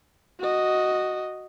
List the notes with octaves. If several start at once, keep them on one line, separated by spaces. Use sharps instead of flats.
F#4 D#5